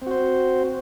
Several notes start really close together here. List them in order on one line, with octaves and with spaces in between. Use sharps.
C4 F#4 C5